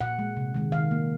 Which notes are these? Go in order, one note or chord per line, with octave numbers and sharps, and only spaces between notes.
A#2 F#5
G#3
C3
D#3 G#3
D#3 F5
A#3